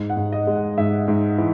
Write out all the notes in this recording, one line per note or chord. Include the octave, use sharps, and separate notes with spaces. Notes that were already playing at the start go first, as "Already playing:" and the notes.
Already playing: G#2
F#5
G#2
D#5
G#3
F#5
G#2 E5
G#2
E3